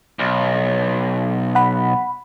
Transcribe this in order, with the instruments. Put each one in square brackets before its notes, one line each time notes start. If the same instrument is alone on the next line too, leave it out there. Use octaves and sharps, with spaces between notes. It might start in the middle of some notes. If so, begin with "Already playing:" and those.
[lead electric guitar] B1
[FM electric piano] F#5 B5